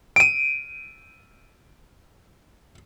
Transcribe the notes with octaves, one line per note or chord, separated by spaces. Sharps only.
D7 D#7